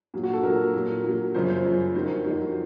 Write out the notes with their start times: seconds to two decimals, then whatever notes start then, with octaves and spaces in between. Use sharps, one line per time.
0.14 A#2 F#3
0.23 F#4
0.33 A4
0.43 A#2 F#3 A#4
0.74 A#2 F#3
1.04 A#2 F#3
1.34 F#2 C#3 F3 C5
1.50 C5
1.64 F#2 C#3 F3
1.95 F2 D#3 F#3 C5
2.24 F2 D#3 F#3